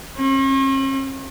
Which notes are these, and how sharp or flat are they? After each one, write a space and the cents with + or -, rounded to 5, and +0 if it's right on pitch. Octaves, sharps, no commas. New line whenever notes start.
C#4 -45